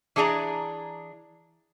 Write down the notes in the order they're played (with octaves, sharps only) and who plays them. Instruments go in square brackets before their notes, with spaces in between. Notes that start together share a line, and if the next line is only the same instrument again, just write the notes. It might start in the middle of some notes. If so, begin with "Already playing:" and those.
[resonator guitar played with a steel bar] E3 D4 G#4 D5 A#5